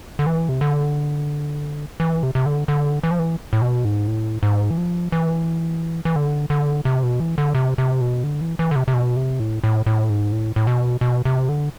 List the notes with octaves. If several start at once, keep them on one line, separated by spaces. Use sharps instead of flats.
D3
E3
C3
D3
E3
C3
C3
D3
D3
E3
F3
E3
A2
B2
G#2
A2
G#2
E3
F3
E3
E3
D3
D3
C3
B2
E3
D3
C3
C3
B2
D3
E3
E3
D3
C3
C3
B2
C3
A2
A2
A2
G#2
A2
A2
B2
B2
C3
D3